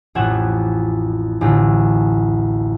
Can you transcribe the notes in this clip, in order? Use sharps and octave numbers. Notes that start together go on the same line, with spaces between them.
A1 F2 F#5 G#6 E7
A1 D2 F4